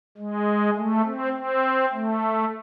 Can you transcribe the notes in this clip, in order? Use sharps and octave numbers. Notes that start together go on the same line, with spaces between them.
G#3
A3
C4
C4
A3